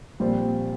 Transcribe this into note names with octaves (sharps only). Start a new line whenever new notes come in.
A#1 A#2 G3 C4 F4